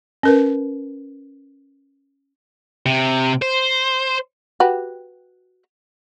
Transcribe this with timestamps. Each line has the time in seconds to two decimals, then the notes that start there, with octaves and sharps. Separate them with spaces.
0.23 C#4 A#4 B4
2.86 C3
3.42 C5
4.60 F#4 G4 B4